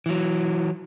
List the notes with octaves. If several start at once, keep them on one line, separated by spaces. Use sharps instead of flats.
E3 F#3